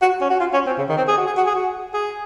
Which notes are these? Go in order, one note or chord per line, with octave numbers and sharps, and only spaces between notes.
F#4
C#4
F#4
F4
C#4
C4
C#3
D#3
C4
G#4
F#4
G#4
F#4
G#4
F#4
G#4